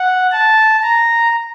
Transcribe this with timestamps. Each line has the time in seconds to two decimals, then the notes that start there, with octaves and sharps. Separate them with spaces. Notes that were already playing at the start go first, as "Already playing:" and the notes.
Already playing: F#5
0.32 A5
0.82 A#5